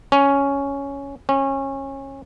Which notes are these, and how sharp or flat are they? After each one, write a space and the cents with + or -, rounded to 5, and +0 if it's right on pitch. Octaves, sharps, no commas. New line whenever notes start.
C#4 +5
C#4 -25